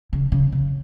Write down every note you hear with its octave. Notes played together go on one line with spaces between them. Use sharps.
C#3
C#3
C#3